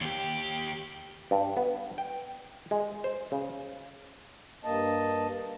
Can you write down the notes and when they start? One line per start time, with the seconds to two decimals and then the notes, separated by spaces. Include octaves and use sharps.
0.01 D#2 G4
1.31 G2
1.57 B3
1.98 G5
2.71 G#3
3.04 C5
3.32 C#3
4.64 G2 A#3 D#5 A5